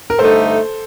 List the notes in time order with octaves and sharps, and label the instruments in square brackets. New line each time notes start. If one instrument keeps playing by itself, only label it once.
[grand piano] A#4
[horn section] G2 D3 A3 D#4 [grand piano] A4 C5